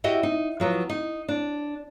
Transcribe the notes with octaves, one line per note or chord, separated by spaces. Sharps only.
E4 F#4 G4 D#5 E5
D#4
F3 F#3 B3
D#4
D4